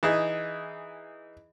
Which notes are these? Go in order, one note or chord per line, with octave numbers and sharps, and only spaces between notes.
E3 D#4 G#4